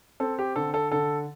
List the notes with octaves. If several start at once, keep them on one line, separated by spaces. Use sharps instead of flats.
C4 A4
G4
D3 A4
A4
D3 A4